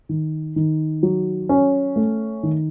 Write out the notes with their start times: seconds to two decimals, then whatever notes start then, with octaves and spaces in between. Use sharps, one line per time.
0.09 D#3
0.56 D#3
1.03 F#3
1.49 C#4
1.96 A3
2.43 D#3